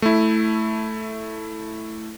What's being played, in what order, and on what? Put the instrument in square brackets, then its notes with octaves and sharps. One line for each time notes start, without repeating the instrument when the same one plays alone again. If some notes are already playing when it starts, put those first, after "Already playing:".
[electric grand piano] A3 E4